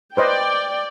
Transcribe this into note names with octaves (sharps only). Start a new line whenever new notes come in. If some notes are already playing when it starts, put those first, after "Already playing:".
B4 C5 D5 D#5 G5